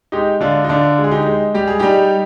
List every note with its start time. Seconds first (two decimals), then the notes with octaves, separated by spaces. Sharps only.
0.12 G#3 D#4 G4
0.40 D3 D4 F4
0.64 D#4
0.69 D3 D4 F4
0.98 G#3
1.04 G#4
1.11 D#4 G4
1.26 G#3
1.54 G3 G4
1.67 G#4
1.79 G3 D#4 G4